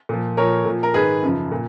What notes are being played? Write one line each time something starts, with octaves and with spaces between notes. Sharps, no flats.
A#2 F3
A#2 F3 A#4 C#5
A#2 F3
A#4
G#2 D#3 G#4 B4
F#2 C#3 F3
A#2